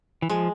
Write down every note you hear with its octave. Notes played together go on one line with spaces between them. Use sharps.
E3
F3 G#3